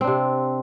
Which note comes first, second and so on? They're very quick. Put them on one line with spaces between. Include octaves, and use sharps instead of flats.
C4 D4 C3